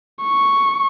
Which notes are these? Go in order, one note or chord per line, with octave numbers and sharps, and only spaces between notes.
C#6